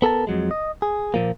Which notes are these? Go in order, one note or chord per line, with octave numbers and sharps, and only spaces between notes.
B3 A4 A#4 A5
F2 F#3 G#3
D#5
G#4
A#2 F3 A#3